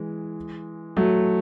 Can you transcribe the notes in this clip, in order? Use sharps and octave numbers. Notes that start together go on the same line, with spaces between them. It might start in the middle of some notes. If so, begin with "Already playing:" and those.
Already playing: E3 G#3
F#3 A3